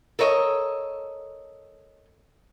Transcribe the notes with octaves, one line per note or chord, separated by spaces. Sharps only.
A4 A#4 C#5 D#5